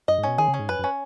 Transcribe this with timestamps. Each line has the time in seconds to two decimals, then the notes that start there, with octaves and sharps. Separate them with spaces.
0.08 F#2 D#5
0.18 G#2
0.23 B2 C#4
0.38 D#3 G#4
0.48 C#3
0.54 C#4
0.59 G#2
0.69 F#2 B4
0.79 F#2
0.84 C#4